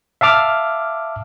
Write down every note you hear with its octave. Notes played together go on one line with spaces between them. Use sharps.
E5 F5 A5 D6 F6